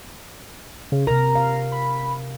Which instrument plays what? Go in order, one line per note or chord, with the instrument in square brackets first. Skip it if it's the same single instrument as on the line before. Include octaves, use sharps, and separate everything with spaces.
[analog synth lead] C#3
[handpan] C3 A#4 [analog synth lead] A#5
[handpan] F5
[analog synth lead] B5